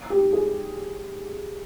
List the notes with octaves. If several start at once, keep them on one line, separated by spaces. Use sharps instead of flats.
G4
G#4